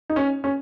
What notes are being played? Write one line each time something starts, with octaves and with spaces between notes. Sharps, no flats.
D#4
C#4
C#4